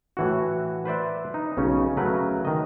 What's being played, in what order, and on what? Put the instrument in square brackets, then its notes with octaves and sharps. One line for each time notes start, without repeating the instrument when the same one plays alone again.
[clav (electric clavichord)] A2 E3 F#4
B4 C5 D5 E5
D#4
B1 C#3 C#4
C#3 F#3 A3 A#4 B4
D#3 D#5